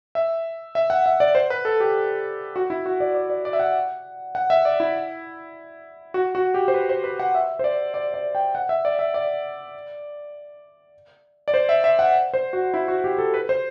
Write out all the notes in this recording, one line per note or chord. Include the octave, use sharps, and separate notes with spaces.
E5
E5
F#5
E5
D5
C5
B4
A4
G4
F#4
E4
F#4
D5
D5
D5
D5
E5
F#5
F#5
E5
D5
E4
F#4
F#4
G4
C5
B4
C5
B4
F#5
E5
C5
D5
D5
D5
G5
F#5
E5
D5
E5
D5
D5
C5
E5
E5
F#5
C5
F#4
E4
F#4
G4
A4
B4
C5